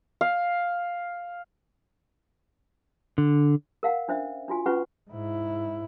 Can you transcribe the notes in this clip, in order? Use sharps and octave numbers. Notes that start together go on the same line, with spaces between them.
F5
D3
A#4 F5 F#5
C#4 D4 C5 E5
D4 F4 F#4 G#5
C#4 F4 B4 F#5 C#6
G#2 E4